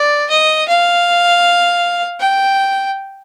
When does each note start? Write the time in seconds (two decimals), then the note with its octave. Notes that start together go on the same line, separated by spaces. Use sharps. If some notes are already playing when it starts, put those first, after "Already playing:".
Already playing: D5
0.30 D#5
0.68 F5
2.20 G5